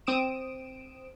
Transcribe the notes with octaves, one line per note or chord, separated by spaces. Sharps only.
C4 D#6 D7 E7